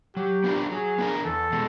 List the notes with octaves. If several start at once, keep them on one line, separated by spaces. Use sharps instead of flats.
F#3 G4
B3 D4 F4 A#4
F#3 G#4
B3 D4 F4 A#4
E2 A4
B2 G#3